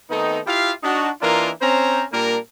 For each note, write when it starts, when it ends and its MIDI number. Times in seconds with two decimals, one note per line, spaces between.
0.11 0.39 51
0.11 0.39 57
0.11 0.39 59
0.11 0.39 60
0.11 0.39 63
0.47 0.72 64
0.47 0.72 65
0.47 0.72 67
0.47 0.72 76
0.47 0.72 77
0.84 1.10 62
0.84 1.10 63
0.84 1.10 66
1.22 1.50 52
1.22 1.50 58
1.22 1.50 62
1.22 1.50 63
1.22 1.50 65
1.22 1.50 70
1.62 2.04 60
1.62 2.04 61
1.62 2.04 72
1.62 2.04 82
2.13 2.37 46
2.13 2.37 55
2.13 2.37 58
2.13 2.37 62
2.13 2.37 70